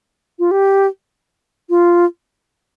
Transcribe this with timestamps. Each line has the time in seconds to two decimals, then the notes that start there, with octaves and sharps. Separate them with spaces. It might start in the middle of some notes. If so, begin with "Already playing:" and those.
0.39 F4
0.51 G4
1.69 F4